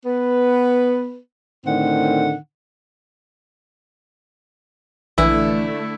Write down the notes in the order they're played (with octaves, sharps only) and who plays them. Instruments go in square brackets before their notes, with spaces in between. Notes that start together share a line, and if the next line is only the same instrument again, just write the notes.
[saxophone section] B3 B4
A2 D3 D#3 C4 F#5
[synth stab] A#1 E3 [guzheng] D3 [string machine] A3 [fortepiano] E4